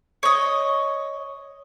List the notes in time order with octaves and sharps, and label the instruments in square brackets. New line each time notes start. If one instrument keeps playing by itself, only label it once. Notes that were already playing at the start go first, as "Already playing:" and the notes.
[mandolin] C#5 D#5